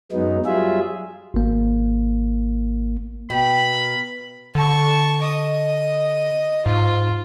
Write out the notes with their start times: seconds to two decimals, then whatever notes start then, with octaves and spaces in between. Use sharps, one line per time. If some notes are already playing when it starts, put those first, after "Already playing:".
0.12 F#2 F#3 G#3 B3 D#4
0.46 F#3 G3 F4 G#4 E5
1.34 G#1 A#3
3.30 B2 G5 B5
3.73 A#4 F5
4.55 D3 A5 C#6
5.22 D#5 D#6
6.66 G#2 F4